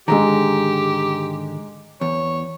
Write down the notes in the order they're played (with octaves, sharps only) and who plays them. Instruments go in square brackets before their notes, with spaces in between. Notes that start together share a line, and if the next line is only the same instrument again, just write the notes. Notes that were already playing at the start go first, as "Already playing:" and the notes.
[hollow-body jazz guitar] G#2 D3 D#3 [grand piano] G#3 A#5 [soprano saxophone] G4
[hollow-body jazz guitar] E2 [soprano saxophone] C#5